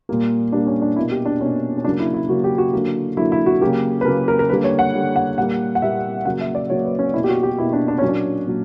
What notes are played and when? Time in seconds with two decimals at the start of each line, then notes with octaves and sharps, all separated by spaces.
0.09 A#2 G3 A#3
0.52 A#2 G3 A#3 D4
0.67 C#4
0.82 D4
0.96 B2 A#3 E4
1.11 G4
1.25 D4
1.41 B2 A#3 C#4
1.77 C#4
1.84 C#3 F#3 A#3 D4
2.00 E4
2.14 E4
2.28 C#3 F#3 A#3 F#4
2.44 G4
2.58 F#4
2.73 D3 F#3 A#3
3.17 D3 F#3 A#3 E4
3.32 E4
3.46 F#4
3.61 C#3 F#3 A#3 G4
4.01 B4
4.05 C#3 F#3 A#3 A#4
4.28 A#4
4.39 A#4
4.49 D3 G3 A#3 B4
4.64 C#5
4.79 F#5
4.94 D3 G3 A#3
5.16 F#5
5.37 A#2 G3 A#3 F#5
5.75 F#5
5.82 A#2 G3 A#3 E5
6.25 C#3 F#3 A#3 F#5
6.41 E5
6.55 D5
6.70 C#3 F#3 A#3 C#5
6.85 B4
6.99 C#4
7.14 B2 A#3 E4
7.24 G4
7.29 F#4
7.43 G4
7.58 B2 A#3 E4
7.73 D4
7.88 D4
7.98 A#2 F#3 A#3 C#4
8.08 D4
8.46 A#2 F#3